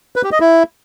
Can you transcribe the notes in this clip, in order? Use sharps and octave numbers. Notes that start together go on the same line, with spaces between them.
B4
G4
D#5
E4